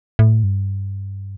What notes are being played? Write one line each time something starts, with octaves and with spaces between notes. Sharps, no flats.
A2
G2